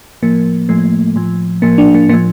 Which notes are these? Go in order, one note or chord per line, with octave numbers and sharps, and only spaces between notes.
A2 F3 A#3
A2 F3 A3
A2 F3
A2 F3 A#3
D4
A#3
A2 F3 A#3